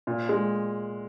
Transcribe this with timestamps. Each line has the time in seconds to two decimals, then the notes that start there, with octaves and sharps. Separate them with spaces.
0.07 A#2
0.29 G#3